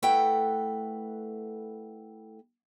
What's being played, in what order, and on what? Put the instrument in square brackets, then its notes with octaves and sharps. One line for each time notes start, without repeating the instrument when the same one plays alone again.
[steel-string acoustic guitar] A3 E4 A4 B4 F#5 G5